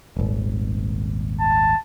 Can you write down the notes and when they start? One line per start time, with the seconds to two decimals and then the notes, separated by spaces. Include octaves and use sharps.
0.17 D#1 G#1
1.40 A5